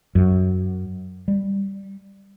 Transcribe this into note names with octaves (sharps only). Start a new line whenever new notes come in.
F#2
G3